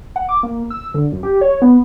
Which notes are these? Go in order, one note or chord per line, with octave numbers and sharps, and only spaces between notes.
F#5
D6
A#3
E6
D3
F#2
G4
C#5
B3